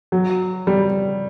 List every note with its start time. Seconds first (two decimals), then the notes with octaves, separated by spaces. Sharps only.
0.12 F#3
0.67 G3